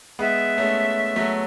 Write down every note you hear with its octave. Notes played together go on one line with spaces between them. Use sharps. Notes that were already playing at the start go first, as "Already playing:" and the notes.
G#3 B3 E5
A3 C#4
F#3 A3